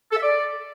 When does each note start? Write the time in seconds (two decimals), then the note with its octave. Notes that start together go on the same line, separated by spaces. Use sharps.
0.11 A4
0.17 E5
0.22 D5